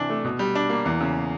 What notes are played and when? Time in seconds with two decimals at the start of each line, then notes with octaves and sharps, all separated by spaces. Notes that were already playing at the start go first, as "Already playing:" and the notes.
Already playing: C3 E3 D4
0.10 A3
0.25 B2
0.39 G3
0.55 D4
0.70 A#3
0.85 E2
1.01 C#3